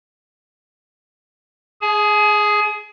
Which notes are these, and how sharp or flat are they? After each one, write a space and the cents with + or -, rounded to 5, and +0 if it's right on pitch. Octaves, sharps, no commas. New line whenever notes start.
G#4 +0 G#5 +35